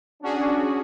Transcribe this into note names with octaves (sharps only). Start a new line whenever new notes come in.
C#4 D4 F#4 G#4